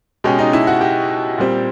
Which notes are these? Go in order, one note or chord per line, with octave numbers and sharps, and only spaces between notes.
B2 G#3 C#4 G4
D#4
E4
F#4
G4
A#2 G3 C4